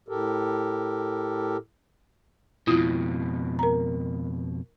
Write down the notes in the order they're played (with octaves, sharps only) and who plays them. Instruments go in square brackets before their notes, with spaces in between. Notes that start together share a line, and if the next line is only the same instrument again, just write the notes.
[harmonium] A2 G4 A4 A#4
[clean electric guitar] F2 B2 [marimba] E4 F4 D#6
[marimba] A#4 A#5